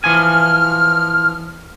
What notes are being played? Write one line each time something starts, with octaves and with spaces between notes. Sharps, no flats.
E3 F3 G#5 F6